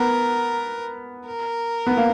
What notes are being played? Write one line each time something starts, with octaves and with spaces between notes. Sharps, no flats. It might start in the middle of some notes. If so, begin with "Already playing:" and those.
Already playing: B3 A#4
A#4
B3
A#3